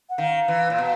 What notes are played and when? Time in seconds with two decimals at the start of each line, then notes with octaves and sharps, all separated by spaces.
0.10 F#5
0.18 D#3 F5
0.48 E3
0.70 A#2
0.78 B2